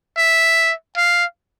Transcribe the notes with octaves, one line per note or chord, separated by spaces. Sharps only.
E5
F5